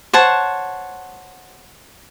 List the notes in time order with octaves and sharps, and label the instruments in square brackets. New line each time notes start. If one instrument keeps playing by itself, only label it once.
[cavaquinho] C5 C#5 F#5 A5